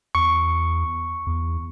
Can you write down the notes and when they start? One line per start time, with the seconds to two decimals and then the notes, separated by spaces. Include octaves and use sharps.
0.15 E2 C#6
1.27 E2